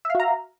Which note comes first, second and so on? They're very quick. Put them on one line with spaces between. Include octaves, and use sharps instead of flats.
E5 F5 F#4 A#5